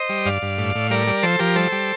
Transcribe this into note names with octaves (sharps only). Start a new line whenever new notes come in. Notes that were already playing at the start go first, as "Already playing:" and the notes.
Already playing: C5 D#5
G3
G2 D5 F5
G2
A2
A2
G3 A#4 D5
G3
F3 A4 C5
F3 G4 A#4
G3 A4 C5
G3